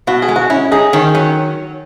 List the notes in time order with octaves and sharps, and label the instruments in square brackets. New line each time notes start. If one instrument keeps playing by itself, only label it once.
[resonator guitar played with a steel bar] B2 [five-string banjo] F#4
[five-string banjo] G#4
[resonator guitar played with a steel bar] G#3
[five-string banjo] F#4
[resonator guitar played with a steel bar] C#4 [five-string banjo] E4
[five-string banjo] D#4 [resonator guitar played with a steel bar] G#4
[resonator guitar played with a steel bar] D#3 [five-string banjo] C#4
[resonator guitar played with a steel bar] F#3 [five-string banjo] C#4